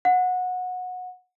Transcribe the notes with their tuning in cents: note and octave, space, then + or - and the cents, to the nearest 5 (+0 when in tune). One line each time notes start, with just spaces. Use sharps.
F#5 -20